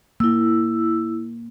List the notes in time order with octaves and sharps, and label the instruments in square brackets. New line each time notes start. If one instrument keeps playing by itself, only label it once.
[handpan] A#3 [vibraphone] E4 E6